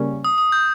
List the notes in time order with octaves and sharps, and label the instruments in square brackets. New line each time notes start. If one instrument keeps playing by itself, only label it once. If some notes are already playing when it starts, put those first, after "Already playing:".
Already playing: [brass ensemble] C#3 G3 A#3 C#4
[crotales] D#6
D#6
G6